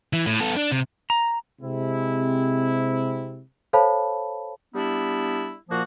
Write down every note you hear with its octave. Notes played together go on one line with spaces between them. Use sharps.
E3
A2
B3 A4
D4
C3
A#5
C3 G#3 C4 E4
A4 C5 C#5 F5 A5 B5
G3 B3 D4 E4
A#2 F3 A#3 F#4